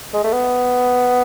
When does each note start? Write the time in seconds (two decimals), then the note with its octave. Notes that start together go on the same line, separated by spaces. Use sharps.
0.14 G#3
0.24 A3
0.32 B3